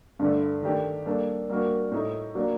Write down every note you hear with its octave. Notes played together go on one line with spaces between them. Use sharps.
G2 D3 A3
D#3 A3 D4 G4
G3 A#3 D4 A4
G3 A#3 D4 F#4 A#4
A2 A3 D#4
F#3 A#3 D4